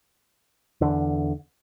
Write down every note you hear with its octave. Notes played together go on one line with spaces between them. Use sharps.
E2 D3